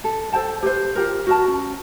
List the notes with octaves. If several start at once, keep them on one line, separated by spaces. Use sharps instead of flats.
A4
A4 C5 G5 A5
G4 B4 C5
F4 G4 A#4
F#4 A#4 A5
C#4